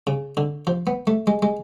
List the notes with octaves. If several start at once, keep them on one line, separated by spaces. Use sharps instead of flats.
C#3
D3
F3
B3
A3
G#3
G#3